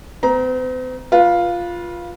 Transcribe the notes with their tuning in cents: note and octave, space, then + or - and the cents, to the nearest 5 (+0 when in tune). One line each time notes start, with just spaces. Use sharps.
C4 -45 A#5 +15
F4 +0 B4 -25